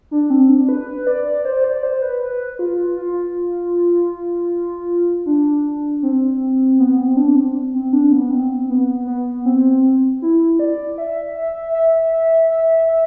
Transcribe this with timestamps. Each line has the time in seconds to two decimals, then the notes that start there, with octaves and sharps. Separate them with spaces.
0.11 D4
0.30 C4
0.49 D4
0.69 B4
1.07 D5
1.45 C5
1.64 D5
1.83 C5
2.02 B4
2.21 B4
2.59 F4
2.97 F4
5.26 D4
6.03 C4
6.79 B3
6.98 C4
7.17 D4
7.36 C4
7.74 C4
7.93 D4
8.12 B3
8.31 C4
8.69 B3
9.07 B3
9.45 C4
10.22 E4
10.59 D5
10.98 E5
11.35 E5
11.74 E5
12.13 E5
12.50 E5
12.88 E5